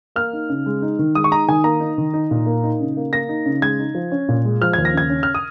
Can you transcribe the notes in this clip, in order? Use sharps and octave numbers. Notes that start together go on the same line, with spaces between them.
A#3 F6
D#4
C#3
G#3
D#4
D#3
G#3 D#6
C#6
D#4 A#5
D#3 G#5
A#3 A#5
D#4
D#3
D#4
A#2
A#3
D#4
C#3
A#3
A#3 A#6
D#4
C#3
G#3 G#6
D#4
F3
C#4
A#2
G#3
F3 F6
G#6
D#2
A#6
C#3 G#6
C#4
F6
D#6